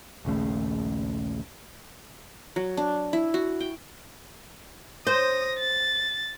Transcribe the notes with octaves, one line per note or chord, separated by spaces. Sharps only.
A#1 D#2 C#3 A3
F#3
D4
E4
F#4
G5
C5 D#6 A#6
A6